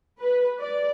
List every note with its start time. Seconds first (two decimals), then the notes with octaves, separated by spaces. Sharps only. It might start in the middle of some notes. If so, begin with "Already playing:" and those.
0.20 B4
0.60 D5